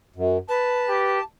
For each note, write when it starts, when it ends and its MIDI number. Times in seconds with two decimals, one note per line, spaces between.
0.16 0.38 42
0.49 1.18 71
0.49 1.23 81
0.89 1.20 67